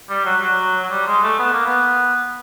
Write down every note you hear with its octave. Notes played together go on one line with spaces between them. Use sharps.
G3
F#3
F#3
F#3
G3
G#3
A3
B3
A#3
B3